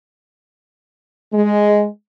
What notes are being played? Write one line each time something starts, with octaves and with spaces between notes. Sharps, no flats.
G#3